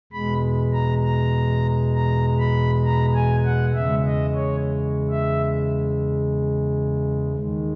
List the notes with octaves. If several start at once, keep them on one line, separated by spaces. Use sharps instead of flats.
E2 B2 G#3 B5
A#5
A#5
A#5
B5
A#5
G#5
F#5
E2 C#3 G#3 E5
D#5
C#5
E5
D#2 D#3 G#3